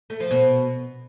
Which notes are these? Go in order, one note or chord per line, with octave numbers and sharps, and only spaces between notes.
A3
F3
B2